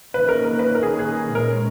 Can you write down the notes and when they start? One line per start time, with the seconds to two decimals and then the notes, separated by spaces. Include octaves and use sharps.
0.13 D#3 A#3 C#4 B4
0.29 A#4
0.45 A#4
0.59 B4
0.75 A#4
0.83 G#4
0.99 G#4
1.35 A#2 G#3 C#4 A#4